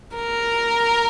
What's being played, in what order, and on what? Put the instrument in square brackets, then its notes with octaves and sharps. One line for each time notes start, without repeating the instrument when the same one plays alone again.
[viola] A#4